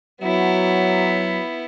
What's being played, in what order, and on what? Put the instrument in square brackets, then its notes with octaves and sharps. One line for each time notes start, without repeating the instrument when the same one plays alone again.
[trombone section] F#3 [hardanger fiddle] B3 E4